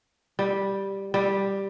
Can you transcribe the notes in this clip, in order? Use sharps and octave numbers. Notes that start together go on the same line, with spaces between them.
G3
G3